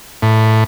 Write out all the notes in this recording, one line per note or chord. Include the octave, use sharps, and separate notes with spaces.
A2